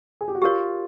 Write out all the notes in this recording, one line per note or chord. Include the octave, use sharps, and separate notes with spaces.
G#4
G4
F#4
F4 G4 A#4 C#5